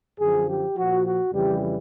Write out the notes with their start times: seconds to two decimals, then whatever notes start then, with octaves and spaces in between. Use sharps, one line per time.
0.20 F#2 D3 F3 G#4
0.49 G4
0.76 A#2 F3 F#4
1.05 F#4
1.33 F2 C#3 E3 G3 G4